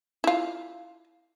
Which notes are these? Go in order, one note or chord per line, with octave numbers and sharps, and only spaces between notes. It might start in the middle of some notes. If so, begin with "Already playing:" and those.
E4 F4